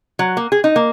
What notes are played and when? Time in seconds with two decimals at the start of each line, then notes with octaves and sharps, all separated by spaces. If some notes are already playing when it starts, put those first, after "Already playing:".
0.19 F#3
0.37 A#3
0.52 G#4
0.64 D#4
0.76 A#3